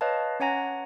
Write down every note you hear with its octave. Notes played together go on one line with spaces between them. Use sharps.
B4 C#5 D#5 F5 A5
C#4 C#5 F#5 G#5 A#5 A#6